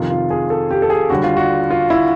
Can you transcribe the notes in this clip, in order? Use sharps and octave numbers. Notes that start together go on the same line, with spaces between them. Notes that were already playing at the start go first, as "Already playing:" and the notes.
Already playing: F2 C3 D#3 F4
F4
G#4
A4
G4
A4
G#4
D#2 D3 G3 F#4
F4
F#4
F4
E4